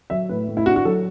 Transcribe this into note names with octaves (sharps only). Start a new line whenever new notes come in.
F#3 E5
A2 B4
A2
E4
D4 F#4
F#4
F#3 A4